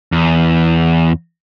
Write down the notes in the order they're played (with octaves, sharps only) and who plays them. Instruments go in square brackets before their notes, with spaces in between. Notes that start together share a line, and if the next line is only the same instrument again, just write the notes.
[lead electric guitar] E2